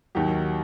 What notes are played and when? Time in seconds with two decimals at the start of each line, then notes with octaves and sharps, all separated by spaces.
0.15 D#2 D#3 F#3 G4